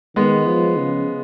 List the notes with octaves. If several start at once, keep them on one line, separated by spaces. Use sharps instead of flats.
D#3 G#3 B3
F3
C#3